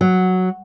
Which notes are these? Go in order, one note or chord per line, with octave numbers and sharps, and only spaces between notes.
F#3